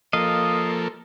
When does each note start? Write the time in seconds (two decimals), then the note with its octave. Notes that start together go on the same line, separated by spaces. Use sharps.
0.13 F3 A#3 A4 D#5 F5